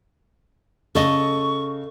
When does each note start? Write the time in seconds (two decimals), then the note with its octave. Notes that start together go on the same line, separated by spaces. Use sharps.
0.95 C#3 A4 D#5 C#6